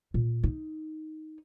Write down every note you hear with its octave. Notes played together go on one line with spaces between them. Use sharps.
A#2
D#4